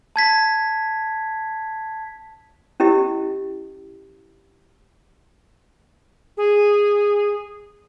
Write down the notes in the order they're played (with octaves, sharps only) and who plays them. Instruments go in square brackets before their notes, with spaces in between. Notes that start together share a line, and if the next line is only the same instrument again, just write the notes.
[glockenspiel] A5 G#6 B6
[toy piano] C#4 E4 G4 D#5
[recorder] G#4